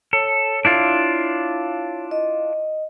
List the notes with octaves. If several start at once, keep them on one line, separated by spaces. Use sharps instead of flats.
A4 C#5
D4 E4 F4
D#5